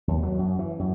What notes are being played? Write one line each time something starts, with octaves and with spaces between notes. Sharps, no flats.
D#2
F#3
F#2
E3
F#2